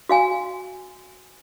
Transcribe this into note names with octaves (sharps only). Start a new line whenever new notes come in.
F#4 F5 G#5